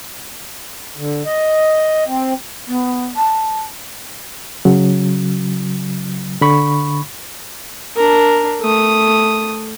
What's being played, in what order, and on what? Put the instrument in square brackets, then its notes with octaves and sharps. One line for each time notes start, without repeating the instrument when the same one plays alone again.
[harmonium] D3
D#5
C4
[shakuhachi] B3
A5
[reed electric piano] C#3 F#3
D3 B5 C#6
[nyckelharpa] D4 A#4
A3 D#6